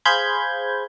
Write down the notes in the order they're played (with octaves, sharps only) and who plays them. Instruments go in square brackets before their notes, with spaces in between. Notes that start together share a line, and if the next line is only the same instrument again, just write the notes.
[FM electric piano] G#4 C5 F5 B5 G6 G#6